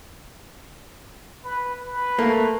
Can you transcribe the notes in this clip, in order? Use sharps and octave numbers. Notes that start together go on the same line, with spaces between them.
B4
B4
A3 A#3